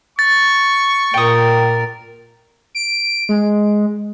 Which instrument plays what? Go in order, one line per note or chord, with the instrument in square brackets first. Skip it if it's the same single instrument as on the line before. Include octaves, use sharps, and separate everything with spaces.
[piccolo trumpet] C#6 [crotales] A6
[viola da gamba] A#2 A#4 [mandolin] G5 D#6
[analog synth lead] D7
G#3